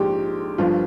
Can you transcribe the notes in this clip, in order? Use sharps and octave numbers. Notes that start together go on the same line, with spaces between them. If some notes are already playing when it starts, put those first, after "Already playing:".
Already playing: A#1 G#2 F3 G4
G1 G2 F3 F4